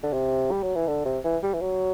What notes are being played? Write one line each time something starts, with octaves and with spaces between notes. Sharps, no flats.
D3
C3
G3
F#3
E3
D3
C3
E3
G3
E3
F#3